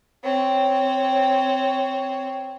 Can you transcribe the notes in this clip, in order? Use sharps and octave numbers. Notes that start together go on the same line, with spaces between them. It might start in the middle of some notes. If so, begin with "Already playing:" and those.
C4 C#5